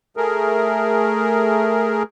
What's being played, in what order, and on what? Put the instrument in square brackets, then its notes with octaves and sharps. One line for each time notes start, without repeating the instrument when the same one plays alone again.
[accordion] A3 G#4 A#4